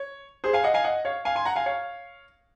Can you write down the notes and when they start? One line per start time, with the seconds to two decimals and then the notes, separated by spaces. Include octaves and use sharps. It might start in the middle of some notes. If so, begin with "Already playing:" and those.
Already playing: C#5
0.44 G#4 C5
0.53 F5 G#5
0.64 D#5 F#5
0.74 F5 G#5
0.84 D#5 F#5
1.05 C#5 F5
1.25 F5 G#5
1.35 G#5 C6
1.45 F#5 A#5
1.56 F5 G#5
1.66 C#5 F5